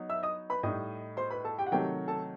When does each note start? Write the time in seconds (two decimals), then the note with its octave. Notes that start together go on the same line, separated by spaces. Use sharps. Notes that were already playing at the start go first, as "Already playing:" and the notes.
Already playing: F#3 B3 D#4
0.09 E5 E6
0.23 D#5 D#6
0.50 B4 B5
0.63 A2 G3 D#4 D#5 D#6
1.17 C5 C6
1.31 B4 B5
1.44 A4 A5
1.58 G4 G5
1.66 F#5
1.72 C3 D#3 F#3 A3 G4 G5
2.08 A4 A5